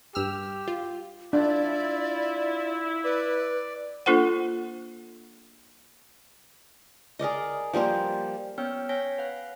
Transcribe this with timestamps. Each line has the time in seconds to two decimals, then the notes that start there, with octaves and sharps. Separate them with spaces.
0.15 G2 G4 E6 F6
0.68 F4
1.33 D4 E4 F4 D5
3.04 B4 D5
4.06 A#3 D4 F4 A4 C5 F#5
7.19 G#4 A#4 D5 D#5
7.73 F3 G3 A#3 C5
8.58 B3 C#4 C#5 G5 E6 F6
8.89 C#5 G5 G#5 A#6 B6
9.18 B4 F5 F#5 F#6